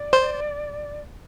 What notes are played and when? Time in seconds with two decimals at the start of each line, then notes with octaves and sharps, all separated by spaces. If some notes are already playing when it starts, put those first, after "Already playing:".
Already playing: D5
0.13 C5